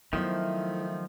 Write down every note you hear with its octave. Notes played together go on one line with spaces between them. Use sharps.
D#3 F3 F#3 A3 B3 E4 C5 E5